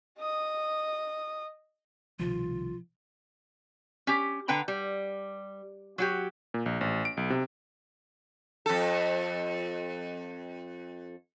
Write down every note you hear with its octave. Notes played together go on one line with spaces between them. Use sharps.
D#5 D#6
C2 B2 D#3 F3 F4
C#4 G4
D3 B4 F#5 G5 A#5
G3
F#3 F#4 G4
A#2
A#1
A1
D7
B1
C3
F2 A4